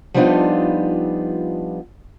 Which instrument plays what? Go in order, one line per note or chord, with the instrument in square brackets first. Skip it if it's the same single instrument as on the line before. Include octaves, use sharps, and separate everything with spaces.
[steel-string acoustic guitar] F3 G3 B3 D4 D#4 F4